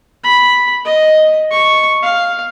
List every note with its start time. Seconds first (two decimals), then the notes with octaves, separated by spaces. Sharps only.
0.24 B5
0.85 D#5
1.51 C#6
2.03 F5